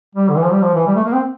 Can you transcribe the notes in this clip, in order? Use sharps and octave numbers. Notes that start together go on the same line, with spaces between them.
G3
D3
E3
F3
G3
F3
E3
G3
A3
A#3
C4